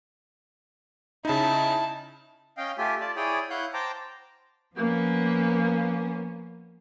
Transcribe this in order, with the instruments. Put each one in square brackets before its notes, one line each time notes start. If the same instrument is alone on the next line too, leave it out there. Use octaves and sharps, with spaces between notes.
[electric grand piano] C#3 D#4 [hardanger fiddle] E4 A5
[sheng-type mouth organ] C#4 D#5 F5 G5
A3 F4 G4 E5 G#5
F4 D5 A5
E4 G#4 C#5 D5 G5 D#6
E4 C#5 F5 F#5 F#6 G6
C5 G5 A5 A#5 D6
[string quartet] F3 A#3 B3 C#4